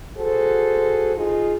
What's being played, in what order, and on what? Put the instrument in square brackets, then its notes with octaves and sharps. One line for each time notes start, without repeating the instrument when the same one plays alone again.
[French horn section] F#4 G#4 A4 C5
D#4 F4 G#4